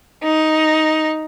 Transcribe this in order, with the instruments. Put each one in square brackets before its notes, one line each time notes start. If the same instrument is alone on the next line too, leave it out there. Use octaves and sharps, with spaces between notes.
[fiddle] D#4